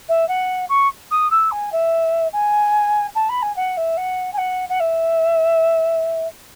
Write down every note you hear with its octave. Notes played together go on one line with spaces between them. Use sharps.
E5
F#5
C#6
D#6
E6
G#5
E5
G#5
A5
B5
G#5
F#5
E5
F#5
G#5
F#5
F#5
E5